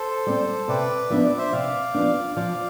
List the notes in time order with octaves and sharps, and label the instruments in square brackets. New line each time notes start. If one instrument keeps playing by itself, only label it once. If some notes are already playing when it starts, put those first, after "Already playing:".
Already playing: [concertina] A4 C5
[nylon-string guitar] G3 C4
[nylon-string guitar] C3 [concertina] B4 D5
[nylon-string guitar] F3 B3 D4 [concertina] E5
[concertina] D5
C5 E5
[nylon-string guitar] C3 [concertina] D5 F5
[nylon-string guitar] F3 B3 D4
[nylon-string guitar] F3 [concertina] D5 F5